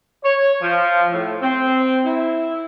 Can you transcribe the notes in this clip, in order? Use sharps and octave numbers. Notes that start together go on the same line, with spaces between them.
C#5
F3
A2
C4
E4